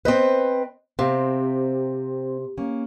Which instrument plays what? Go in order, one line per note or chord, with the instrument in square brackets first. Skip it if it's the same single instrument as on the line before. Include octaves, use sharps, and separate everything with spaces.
[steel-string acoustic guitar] C4 B4 [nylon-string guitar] C5 D#5
[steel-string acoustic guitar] C3 [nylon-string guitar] C4 F5
[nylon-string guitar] A#3 C#4